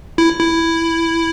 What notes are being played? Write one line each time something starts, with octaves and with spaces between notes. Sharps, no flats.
E4
E4